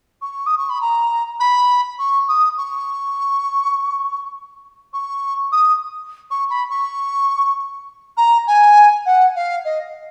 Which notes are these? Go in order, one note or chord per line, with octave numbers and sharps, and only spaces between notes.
C#6
D#6
C#6
B5
A#5
B5
C#6
D#6
C#6
C#6
D#6
C#6
B5
C#6
A#5
G#5
F#5
F5
D#5